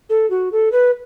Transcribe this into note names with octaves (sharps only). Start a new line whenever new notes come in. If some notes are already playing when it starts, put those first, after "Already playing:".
A4
F#4
A4
B4